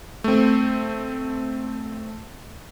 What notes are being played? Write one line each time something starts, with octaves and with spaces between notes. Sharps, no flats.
A3 C4